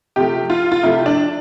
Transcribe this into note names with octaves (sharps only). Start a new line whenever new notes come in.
C3 F3 A3 G4
F4
F4
C3 F3 A3 E4
D4